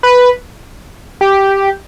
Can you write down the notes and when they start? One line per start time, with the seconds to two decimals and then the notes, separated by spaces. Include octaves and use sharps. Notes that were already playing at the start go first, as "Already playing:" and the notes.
0.03 B4
1.21 G4